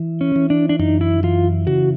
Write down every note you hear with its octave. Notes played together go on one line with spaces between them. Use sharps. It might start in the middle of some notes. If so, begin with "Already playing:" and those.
Already playing: E3
C#4
E3
D4
D4
F#2 D#4
E4
E3 F4
C#3 F#4